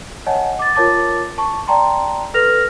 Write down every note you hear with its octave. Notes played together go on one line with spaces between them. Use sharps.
C#5 D#5 F#5 G#5 A5
D6 A6
F4 A#4 C#5 A5 D6 A6
A5 C#6
D5 G5 A5 A#5 C6
A4 B4 F6 A#6 F7